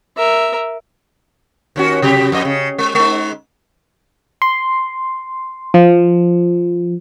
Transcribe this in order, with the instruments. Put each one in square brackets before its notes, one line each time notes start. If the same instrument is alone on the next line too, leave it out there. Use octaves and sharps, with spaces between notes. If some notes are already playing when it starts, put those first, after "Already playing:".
[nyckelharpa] A#4 E5
[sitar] D#2 C#4 F#4
C3 F#3 G4
F2 D#5
C#3
G#3
G#3 D#4
[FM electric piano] C6
F3